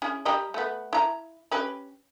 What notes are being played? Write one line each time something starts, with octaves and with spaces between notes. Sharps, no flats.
C#4 E4 G#4
G3 A#4 D#5
A3 B3
E4 A#5
C#4 G4 B4